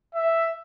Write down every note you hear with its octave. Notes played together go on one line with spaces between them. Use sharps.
E5